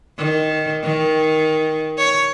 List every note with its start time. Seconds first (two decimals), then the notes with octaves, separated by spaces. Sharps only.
0.18 D#3
0.84 D#3
1.98 C#5